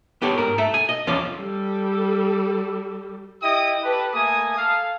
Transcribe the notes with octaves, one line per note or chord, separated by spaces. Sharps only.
B3 G4 A4 C#5
G#2 A#4
A4 E5
G#5
D#5
E2 F3 C#4 F4 D5
G3 A4
E4 G4 D#5 G5 D#6
G4 A4 B4
A3 A#3 G#5 D#6
A4 F5